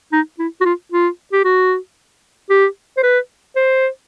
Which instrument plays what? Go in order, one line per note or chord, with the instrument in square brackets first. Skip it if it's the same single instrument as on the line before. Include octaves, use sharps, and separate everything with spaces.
[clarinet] D#4
E4
F#4
F4
F4
G4
F#4
G4
C5
B4
C5